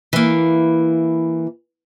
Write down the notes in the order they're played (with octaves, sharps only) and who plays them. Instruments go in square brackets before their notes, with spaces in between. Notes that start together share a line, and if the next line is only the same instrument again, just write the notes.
[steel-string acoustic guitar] E3 A#3